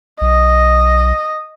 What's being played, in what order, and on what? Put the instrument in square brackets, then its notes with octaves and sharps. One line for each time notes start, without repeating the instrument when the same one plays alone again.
[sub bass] B1 [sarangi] D#5